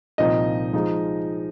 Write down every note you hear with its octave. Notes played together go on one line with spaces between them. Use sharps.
C2 A#2 F3 C4 D#4 D#5
F3 G#3 D#4